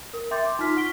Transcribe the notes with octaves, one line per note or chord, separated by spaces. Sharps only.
A#4
E5 G5 C6 D6 G6 A6
C6 D6
D#4 F4 C6 F6 B6
F#5 C#6 F6 B6 D7 G7